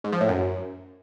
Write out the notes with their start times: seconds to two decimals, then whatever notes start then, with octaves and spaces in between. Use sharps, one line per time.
0.04 G#2
0.13 F3
0.21 A2
0.29 F#2